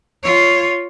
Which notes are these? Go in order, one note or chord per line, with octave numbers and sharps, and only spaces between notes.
F4 C#5